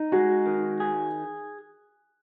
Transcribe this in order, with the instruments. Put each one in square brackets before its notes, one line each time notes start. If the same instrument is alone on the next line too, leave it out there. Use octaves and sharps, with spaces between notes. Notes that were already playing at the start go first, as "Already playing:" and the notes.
Already playing: [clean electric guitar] D#4
[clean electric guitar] G#3 [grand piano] F#4
[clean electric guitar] D#3
G#4